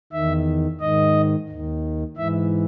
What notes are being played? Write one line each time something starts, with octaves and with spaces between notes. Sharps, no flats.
E2 D#3 E5
G#2 D#3 D#5
D#2 D#3
G#2 E3 E5